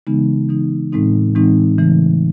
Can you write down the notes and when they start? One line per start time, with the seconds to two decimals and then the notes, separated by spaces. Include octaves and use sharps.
0.07 C#3 E3 G#3 B3 D#4
0.49 C#3 E3 G#3 B3 D#4
0.92 A2 E3 G#3 C4 D#4
1.35 A2 E3 G#3 C4 D#4
1.78 C#3 E3 A3 C4 D#4